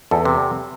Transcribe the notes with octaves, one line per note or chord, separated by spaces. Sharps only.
E2 A4
C3